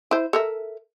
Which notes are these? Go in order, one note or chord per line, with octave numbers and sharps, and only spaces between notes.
E4 C5
A4 A#4 E5